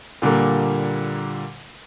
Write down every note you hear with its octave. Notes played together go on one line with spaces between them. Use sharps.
A#2 D3 G3 A#3